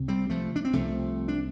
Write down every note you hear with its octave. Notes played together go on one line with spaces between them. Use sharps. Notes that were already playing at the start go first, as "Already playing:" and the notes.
Already playing: C2 C3
G3 C4
F3 A3
D4
C4
C2 C3 F3 A3
D4